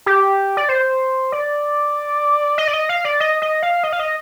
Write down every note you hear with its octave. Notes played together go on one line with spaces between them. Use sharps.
G4
D5
C5
D5
D#5
D5
D#5
F5
D5
D#5
D#5
F5
D#5
F5
D#5